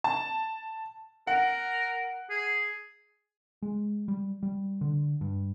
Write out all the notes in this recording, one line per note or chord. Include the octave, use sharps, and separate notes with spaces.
A5
A#4 F#5
G#4
G#3
G3
G3
D3
G2